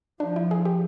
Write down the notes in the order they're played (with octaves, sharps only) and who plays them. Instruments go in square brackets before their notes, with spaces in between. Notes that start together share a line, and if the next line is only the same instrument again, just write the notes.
[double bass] F3 [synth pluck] D4
[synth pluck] E4
G#4
G4